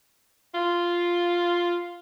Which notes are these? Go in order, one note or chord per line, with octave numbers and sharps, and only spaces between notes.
F4